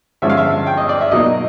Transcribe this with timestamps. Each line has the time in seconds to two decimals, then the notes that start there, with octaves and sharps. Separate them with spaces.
0.22 G2 D3 F3 G#3 C#4 E5
0.30 F5
0.37 E5
0.66 G5
0.77 D#5
0.89 D5
1.01 E5
1.11 B2 F#3 A#3 D#4 D#5